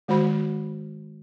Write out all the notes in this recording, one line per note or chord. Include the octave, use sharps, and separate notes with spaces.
D#3 G#3 F#4 C5 B5